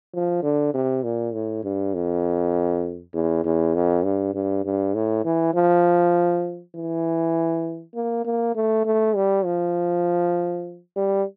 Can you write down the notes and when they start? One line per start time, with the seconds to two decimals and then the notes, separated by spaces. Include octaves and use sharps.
0.14 F3
0.43 D3
0.74 C3
1.04 A#2
1.34 A2
1.64 G2
1.94 F2
3.14 E2
3.44 E2
3.75 F2
4.04 G2
4.34 G2
4.65 G2
4.94 A2
5.25 E3
5.54 F3
6.75 E3
7.95 A#3
8.25 A#3
8.56 A3
8.85 A3
9.15 G3
9.45 F3
10.96 G3